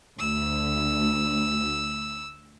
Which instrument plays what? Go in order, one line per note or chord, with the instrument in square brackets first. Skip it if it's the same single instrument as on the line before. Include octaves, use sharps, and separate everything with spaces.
[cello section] D2 [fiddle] E6